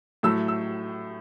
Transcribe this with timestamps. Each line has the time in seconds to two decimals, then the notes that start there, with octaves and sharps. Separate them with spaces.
0.23 A2 F#3 A3 E6
0.48 E6